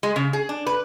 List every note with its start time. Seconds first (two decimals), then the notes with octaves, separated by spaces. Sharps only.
0.03 G#3
0.16 C#3
0.33 G#4
0.49 D4
0.67 B4